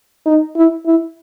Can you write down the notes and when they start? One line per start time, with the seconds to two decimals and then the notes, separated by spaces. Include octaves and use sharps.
0.26 D#4
0.56 E4
0.86 E4